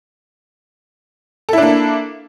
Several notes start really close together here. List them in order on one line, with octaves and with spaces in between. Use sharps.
A4 E4 D4 A#3